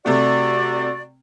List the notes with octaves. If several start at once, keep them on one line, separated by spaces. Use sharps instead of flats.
C3 A3 F#4 D5